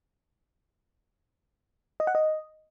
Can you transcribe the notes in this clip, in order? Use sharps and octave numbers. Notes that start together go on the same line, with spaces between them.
D#5
F#5
D#5